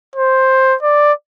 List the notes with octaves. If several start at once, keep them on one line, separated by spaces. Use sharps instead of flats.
C5
D5